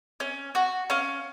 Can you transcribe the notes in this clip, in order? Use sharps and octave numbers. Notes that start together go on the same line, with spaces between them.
C#4
F#4
C#4 F5